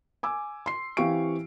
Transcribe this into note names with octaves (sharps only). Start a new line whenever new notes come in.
G#5 D6 E6
C6 C7
E3 C4 G4 F5 C#6 D7